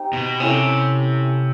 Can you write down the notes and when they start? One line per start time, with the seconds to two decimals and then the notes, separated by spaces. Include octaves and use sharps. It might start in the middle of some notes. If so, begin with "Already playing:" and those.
Already playing: C4 D#4 G4
0.13 B2
0.40 C3 C#4 E4 A4